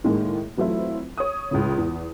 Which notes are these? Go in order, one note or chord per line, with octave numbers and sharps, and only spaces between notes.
A2 D#3 G#3 A#3
E3 F#3 A3 C4 E4 F4
C#5 D#6
C#2 A2 C#3
E2